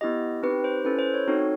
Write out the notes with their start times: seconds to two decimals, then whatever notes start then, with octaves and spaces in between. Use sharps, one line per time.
0.01 B3 E4 G4 D#5
0.43 C4 D#4 G4 B4
0.64 C5
0.85 C#4 E4 A4 B4
0.99 C5
1.14 C#5
1.28 C4 D#4 F#4 A4 C#5